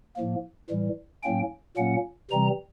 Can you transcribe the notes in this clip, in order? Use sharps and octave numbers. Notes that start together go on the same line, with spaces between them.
A2 F3 A#3
A2 E3 G3
A2 F#3 A#3 C#4 G5
A#2 F#3 A#3 C#4 F#5
C3 E3 G3 C4 A#5